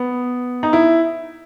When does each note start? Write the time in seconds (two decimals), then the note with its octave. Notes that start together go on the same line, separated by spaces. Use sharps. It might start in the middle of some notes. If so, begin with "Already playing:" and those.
Already playing: B3
0.63 D#4
0.73 E4